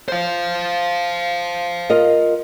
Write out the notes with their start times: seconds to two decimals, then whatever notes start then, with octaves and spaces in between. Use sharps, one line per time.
0.08 C5 F5
1.90 F4 A#4 D#5